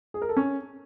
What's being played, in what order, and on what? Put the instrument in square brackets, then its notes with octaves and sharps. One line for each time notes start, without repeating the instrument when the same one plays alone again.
[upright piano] G#4
A#4
A4
C#4